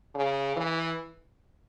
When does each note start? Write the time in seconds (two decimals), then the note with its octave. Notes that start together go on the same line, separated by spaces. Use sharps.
0.15 C#3
0.57 E3